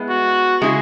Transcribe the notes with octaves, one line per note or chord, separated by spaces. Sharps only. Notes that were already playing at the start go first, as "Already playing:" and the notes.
Already playing: G#3 B3 E4
F#4
C#3 G#3 E4 G#4